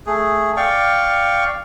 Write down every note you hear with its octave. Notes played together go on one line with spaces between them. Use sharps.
A3 G#4
D5 F5 G5 C#6